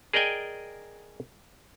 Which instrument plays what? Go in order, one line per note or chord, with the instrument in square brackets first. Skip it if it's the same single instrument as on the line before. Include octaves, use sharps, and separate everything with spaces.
[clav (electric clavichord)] G#4 A#4 D5 D#5 G5 G#5